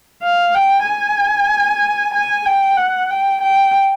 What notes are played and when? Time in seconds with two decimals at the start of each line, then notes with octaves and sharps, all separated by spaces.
0.23 F5
0.55 G5
0.87 G#5
2.15 G#5
2.46 G5
2.78 F#5
3.11 G5
3.42 G5